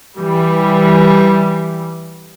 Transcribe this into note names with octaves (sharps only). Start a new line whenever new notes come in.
E3 G3